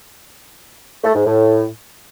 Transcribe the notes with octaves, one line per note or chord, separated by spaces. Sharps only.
A3
G#2
A2